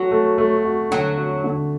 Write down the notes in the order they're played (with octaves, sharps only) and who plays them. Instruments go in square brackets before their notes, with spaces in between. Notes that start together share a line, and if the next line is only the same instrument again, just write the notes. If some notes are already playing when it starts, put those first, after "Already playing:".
Already playing: [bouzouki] F#3 [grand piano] A3 F#4
[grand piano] A3
A3
F#4
[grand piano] D3 [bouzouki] F#3
[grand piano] F#4
D3